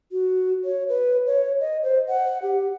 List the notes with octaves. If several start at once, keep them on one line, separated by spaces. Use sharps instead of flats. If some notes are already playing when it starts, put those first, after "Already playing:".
F#4
C#5
B4
C#5
D#5
C5
F#5
G4